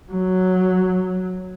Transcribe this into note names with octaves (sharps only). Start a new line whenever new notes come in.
F#3